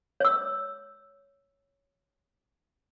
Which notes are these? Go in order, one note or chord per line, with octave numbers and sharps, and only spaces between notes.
C#5 E6